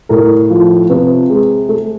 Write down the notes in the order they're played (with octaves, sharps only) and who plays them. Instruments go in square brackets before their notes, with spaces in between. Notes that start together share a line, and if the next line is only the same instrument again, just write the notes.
[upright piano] A2 A#4
F3
C3 B4
G#3
A3